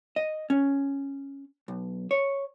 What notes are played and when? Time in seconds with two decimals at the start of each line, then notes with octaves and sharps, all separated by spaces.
0.16 D#5
0.50 C#4
1.68 B1
2.11 C#5